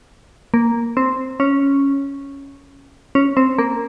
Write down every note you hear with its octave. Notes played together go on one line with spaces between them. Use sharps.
A#3
C4
C#4
C#4
C4
A#3